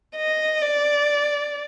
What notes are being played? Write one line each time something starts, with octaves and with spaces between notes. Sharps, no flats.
D#5
D5